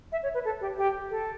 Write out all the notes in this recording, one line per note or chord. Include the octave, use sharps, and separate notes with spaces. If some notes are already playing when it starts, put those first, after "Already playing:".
E5
C#5
B4
A4
G4
G4
A4